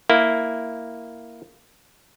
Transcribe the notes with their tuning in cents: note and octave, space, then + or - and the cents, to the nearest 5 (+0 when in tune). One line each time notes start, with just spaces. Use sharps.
A#3 +0 E4 +0